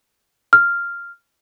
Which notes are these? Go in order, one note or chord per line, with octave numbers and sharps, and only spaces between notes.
F6